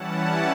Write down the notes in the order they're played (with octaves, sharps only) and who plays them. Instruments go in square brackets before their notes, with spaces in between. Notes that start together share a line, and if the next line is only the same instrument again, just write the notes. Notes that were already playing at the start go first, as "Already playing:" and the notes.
Already playing: [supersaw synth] E3 G3 C#4 E4 F#5 A5